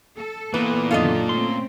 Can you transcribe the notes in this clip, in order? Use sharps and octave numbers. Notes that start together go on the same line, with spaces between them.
A4
A#2 E3 B3 B4
F#2 D3 D#3 F4 A4 D#5
A3 C4 C#4 C6